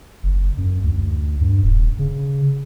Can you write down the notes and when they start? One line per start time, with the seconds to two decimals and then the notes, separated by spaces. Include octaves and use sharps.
0.23 F#1
0.57 F#2
0.84 D2
1.41 G2
1.63 D#1
1.99 C#3